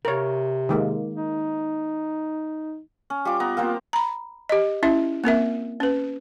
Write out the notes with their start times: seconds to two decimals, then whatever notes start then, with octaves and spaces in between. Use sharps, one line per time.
0.05 C3 A#4 C#5
0.69 D#3 G#3 A#3
1.15 D#4
3.10 C#4
3.25 G3 F4 D6
3.40 B3 A#5
3.57 A#3 C4 F4 C5
3.93 A#5 B5
4.49 G4 D#5
4.83 C#4 E4 E5
5.24 A#3 C4 A#4 E5
5.80 C#4 B4